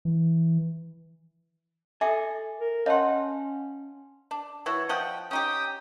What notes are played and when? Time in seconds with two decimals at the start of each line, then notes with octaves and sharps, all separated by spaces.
0.05 E3
2.01 A4 E5 G#5 D6
2.60 A#4
2.86 C#4 C#5 D#5 F5 F#5 A5 C6
4.31 D4
4.66 E3 E4 F#4 C#5
4.89 F3 D#5 F#5 G5
5.31 C#4 D#4 G4 G5 D#6